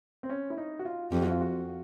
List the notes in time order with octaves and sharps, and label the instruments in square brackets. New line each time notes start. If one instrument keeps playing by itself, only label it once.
[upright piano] C4
C#4
E4
D#4
F#4
F4
[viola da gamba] F2 [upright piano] G4
[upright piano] F#4
F4
F#4